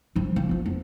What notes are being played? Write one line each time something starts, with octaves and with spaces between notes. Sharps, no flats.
G2 F3
F3
B3 F4
F2 B3